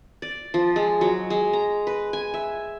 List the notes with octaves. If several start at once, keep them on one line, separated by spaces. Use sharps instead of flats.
D5
F3
G#3
F#3
G#3
A#5
B4
G#5
E5